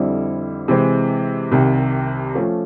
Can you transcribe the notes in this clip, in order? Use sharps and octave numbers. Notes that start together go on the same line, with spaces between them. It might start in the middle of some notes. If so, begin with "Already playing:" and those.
Already playing: F2 D3 G3 C4 E4
C3 E3 G#3 C4
C2 C3 D#3
F3 A3 C#4 F4